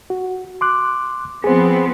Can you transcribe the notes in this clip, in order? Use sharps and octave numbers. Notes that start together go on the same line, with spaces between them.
F#4
C6 D6 F#6
F3 B3 C4 G#4 C5